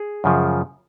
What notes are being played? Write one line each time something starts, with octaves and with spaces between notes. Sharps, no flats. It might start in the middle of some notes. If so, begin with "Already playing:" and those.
Already playing: G#4
F#2 C#3 F3